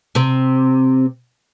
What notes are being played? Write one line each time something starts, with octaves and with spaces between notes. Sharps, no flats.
C3 C4